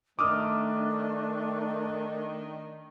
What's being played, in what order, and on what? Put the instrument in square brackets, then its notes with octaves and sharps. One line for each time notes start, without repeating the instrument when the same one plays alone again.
[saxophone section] D#3 [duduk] A3 [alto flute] D4 [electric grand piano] D6 D#6 F6